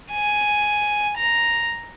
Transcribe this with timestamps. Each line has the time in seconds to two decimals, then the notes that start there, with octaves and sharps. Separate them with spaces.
0.12 G#5
1.17 A#5